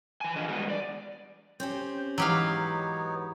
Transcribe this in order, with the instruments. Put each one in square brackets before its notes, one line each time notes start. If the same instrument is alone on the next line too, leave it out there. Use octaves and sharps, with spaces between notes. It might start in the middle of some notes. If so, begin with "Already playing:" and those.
[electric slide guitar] E3 G#5
D4 F4 G#4 D#5
E3 G3 G#3 B3
D5
[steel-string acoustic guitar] C4 C#4 G4 [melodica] C5
[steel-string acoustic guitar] G#2 E3 [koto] F#3 G4 F5 [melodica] B3 D#4 C#5